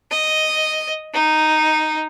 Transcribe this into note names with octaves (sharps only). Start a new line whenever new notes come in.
D#5
D#4